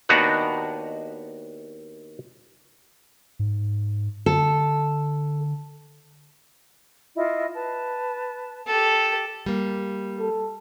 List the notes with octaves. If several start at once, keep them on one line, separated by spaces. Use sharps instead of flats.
D#2 B3 D4 D#4 F#4 F#5
G#2
D3 A4
E4 F4 D#5
B4 A5
G4 A4
G3 A#3
A4